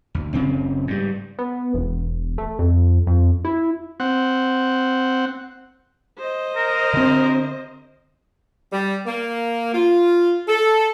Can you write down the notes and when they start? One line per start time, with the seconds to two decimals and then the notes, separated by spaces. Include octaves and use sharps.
0.15 D2
0.33 F#1 C#3 C4
0.87 G#2 G3
1.39 B3
1.74 E1
2.38 A3
2.59 F2
3.07 F2
3.45 E4
4.00 C4 F#5
6.19 C5 D#5
6.56 A#4
6.94 D3 C4
8.73 G3
9.06 A#3
9.74 F4
10.48 A4